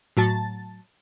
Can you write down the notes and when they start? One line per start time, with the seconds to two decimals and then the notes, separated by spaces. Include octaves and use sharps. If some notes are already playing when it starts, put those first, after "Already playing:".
0.17 A2 F#3 A5 A6